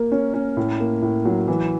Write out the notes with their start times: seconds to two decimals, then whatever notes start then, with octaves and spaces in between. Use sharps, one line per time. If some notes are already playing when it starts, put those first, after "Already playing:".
Already playing: A#3 A#4
0.12 C#4
0.34 C#4
0.57 A2
0.80 A#3
1.02 A2
1.25 F#3
1.48 E3